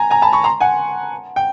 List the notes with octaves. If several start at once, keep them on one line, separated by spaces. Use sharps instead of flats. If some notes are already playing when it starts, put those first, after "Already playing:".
Already playing: G#5 A#5
G#5 A#5
A5 B5
B5 C#6
A#5 C6
F#5 G#5
G5